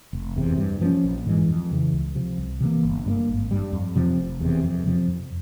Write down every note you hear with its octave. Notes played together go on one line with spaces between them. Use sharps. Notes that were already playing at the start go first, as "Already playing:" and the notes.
F1
E2 C3
G2
F3 A#3 C#4
A#1
G#2 E3 G#3
F2
C#3 E3
C#2
C3 F3
C2
C3 E3 A#3
G1
G2 G3 A#3
G#1
G2 G3
F2
C3 F3 C4
F1
E2 C3
F2
C3 F3 C4
F2